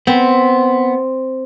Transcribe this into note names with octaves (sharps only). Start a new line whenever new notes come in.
B3 C4